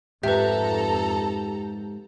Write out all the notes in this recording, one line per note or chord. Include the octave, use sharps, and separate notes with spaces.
F2 G#2 G4 A4 B4 E5 A#5